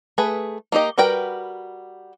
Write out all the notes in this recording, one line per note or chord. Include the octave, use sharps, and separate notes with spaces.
A3 G#4 B4
A#3 D#4 G4 D#5
G3 F#4 A#4 B4 G5